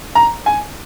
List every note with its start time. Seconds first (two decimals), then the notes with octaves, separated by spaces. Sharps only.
0.15 A#5
0.46 G#5